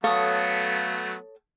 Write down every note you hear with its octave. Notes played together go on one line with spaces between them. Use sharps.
F#3 A3 B3 A4 C#5 F5 D#6